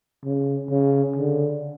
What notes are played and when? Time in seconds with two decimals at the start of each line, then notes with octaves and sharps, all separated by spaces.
0.25 C#3
0.70 C#3
1.16 D3